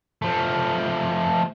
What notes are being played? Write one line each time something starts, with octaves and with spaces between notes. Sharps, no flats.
F3 A3